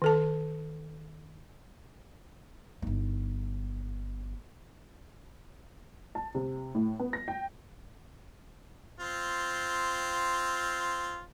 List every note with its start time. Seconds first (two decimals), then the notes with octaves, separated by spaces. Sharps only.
0.02 D#3 A4 A5
2.82 G1 D#4
6.15 A5
6.35 C3
6.75 A2
7.00 B3
7.13 A#6
7.28 G5
9.00 C4 F4